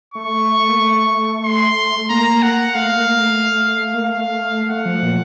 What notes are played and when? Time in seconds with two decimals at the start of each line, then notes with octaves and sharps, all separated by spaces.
0.14 A3 C#6
0.68 A#3
0.80 A3
1.45 C6
2.10 A#3 A#5
2.43 F#5
2.75 A3 F5
2.96 A#3
3.18 A3
3.94 A#3
4.04 A3 F5
4.70 A3 F#5
4.86 F3
5.03 A#2